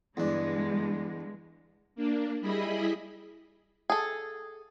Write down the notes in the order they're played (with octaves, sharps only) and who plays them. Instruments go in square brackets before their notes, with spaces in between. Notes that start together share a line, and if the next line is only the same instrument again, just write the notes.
[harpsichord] E2 D4 [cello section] G2 D3 G#3
[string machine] A#3 D4
G3 E4 G#4 D#5 B5
[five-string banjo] G#4 A4